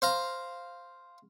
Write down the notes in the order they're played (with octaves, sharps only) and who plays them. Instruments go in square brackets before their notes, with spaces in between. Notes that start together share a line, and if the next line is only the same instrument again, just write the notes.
[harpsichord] C5 F5 A#5